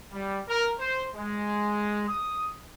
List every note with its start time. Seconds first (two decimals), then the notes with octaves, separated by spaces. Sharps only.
0.12 G3
0.48 A#4
0.80 C5
1.15 G#3
2.08 D#6